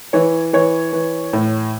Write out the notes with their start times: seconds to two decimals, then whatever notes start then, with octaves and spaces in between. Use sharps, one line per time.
0.13 E3 C#5
0.53 E3 C#5
0.93 E3
1.33 A2